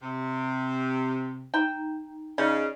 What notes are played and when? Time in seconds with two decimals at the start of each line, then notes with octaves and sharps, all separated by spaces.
0.02 C3
1.54 D#4 G5 A#5
2.38 C#3 D#4 D5